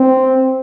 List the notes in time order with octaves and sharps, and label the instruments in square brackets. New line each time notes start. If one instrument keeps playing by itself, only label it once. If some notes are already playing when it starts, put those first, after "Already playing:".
Already playing: [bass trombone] C4